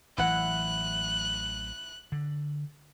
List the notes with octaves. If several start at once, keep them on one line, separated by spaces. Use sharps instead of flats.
A1 E3 F#3 E4 F#5 F#6
D3